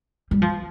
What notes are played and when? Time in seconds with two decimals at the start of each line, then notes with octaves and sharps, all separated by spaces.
0.31 G3
0.42 F3